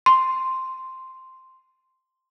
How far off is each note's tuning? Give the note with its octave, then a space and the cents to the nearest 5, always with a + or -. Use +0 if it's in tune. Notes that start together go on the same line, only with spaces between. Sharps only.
C6 +0